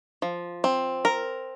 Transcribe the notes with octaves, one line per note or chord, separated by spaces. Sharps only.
F3
C4
A#4